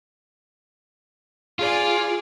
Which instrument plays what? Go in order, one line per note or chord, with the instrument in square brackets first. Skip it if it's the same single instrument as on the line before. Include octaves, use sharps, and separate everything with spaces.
[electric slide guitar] F4 [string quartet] G#4 D5 G#5